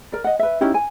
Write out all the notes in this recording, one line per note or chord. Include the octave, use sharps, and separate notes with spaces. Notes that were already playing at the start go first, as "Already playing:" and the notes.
A#4 D5
D#5 F#5
B4 E5
C#4 D#4 E4 G4
G#5